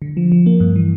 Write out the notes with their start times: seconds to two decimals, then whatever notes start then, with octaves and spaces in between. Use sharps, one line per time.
0.02 D3
0.17 F3
0.32 F3
0.46 A#3
0.60 G2
0.76 E3